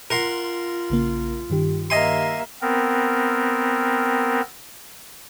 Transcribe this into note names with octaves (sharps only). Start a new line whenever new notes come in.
F4 A#4 F#5 C6
A#1 C#3 A#3
G2 D#3 G4
A#3 D#5 E5 G#5 C6
B3 C4 A#4